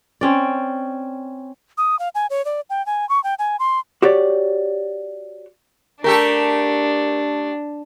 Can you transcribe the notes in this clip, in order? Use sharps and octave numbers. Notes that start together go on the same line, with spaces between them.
C4 C#4 D5
D#6
F5
G#5
C#5
D5
G5
G#5
C#6
G5
G#5
C6
F#4 G4 C#5 D5
A3 D4 G4 A4 A#4